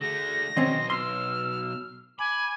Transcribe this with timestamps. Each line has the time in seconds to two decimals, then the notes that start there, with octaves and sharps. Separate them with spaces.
0.01 D3 A3 G#4 A#6
0.57 B1 D#3 C4 C#4 D#5 C6
0.90 C6 E6 F6
2.19 G#5 B5 D6